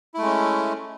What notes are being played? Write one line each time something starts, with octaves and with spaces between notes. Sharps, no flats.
G#3 A3 C#4 E4